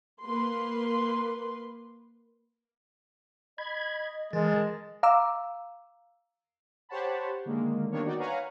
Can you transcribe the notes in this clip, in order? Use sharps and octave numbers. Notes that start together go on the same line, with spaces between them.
A#3 B4 C6
D#5 B5 G#6
E3 G#3 A#4 A5
F5 A#5 D6 E6
G4 C5 C#5 F#5 A5 B5
D3 D#3 G#3 A#3
D#3 G3 A#3 B3 D4 C#5
D#4 F#4 D5 G5
B4 C#5 F5 F#5 G#5 A#5